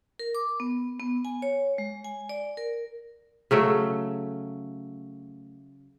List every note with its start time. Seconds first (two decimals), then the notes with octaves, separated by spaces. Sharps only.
0.19 A#4
0.35 D6
0.60 B3
1.00 B3
1.25 G#5
1.42 C#5
1.78 G#3
2.04 G#5
2.29 D5
2.57 A#4
3.51 C#3 F#3 A3